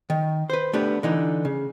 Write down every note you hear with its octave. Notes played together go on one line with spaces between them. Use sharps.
D#3
B4 C5
A3 B3 D4 G4
D3 E3 D#4
C#3